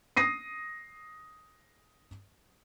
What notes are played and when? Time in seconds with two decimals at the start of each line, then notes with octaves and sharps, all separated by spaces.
0.17 D#6 A#6 C7 D#7